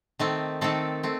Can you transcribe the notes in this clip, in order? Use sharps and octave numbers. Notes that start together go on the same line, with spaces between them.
D#3 A3 C4
D#3 A3 C4 A4
A3 C4